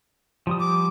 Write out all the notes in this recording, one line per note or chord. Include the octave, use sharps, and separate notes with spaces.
F3 G3 D#6
D6